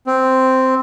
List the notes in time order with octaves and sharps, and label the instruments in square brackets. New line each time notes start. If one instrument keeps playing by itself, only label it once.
[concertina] C4